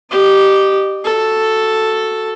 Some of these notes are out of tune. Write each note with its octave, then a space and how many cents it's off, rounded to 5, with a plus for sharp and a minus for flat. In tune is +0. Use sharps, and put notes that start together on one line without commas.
G4 -10 D#5 -30
F#4 +0 A4 +0